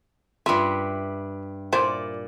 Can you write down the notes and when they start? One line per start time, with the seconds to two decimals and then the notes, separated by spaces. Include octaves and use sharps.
0.46 G2 G3 F4 E5
1.73 A#2 E4 C5 D5